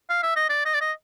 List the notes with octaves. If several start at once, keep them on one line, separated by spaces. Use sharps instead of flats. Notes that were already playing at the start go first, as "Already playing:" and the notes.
F5
E5
D#5
D5
D#5
D5
D#5